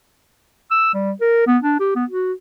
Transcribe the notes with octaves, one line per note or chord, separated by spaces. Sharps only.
E6
G3
A#4
B3
D4
G4
B3
F#4